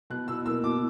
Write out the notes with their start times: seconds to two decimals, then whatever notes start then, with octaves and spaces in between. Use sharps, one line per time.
0.10 B2 F#6
0.28 B2 E6
0.46 A#3 E6
0.64 B2 D6